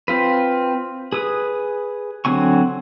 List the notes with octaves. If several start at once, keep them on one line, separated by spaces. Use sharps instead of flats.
C4 F4 B4
G#4 B4 D#6
D3 F#3 C4 G#5 C#6